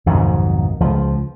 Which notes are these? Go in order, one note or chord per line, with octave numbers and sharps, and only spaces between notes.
B1 F2 G#2 D#3
C#2 F3